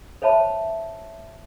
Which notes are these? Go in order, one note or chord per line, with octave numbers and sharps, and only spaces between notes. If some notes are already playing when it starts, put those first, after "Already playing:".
C5 C#5 E5 A5 B5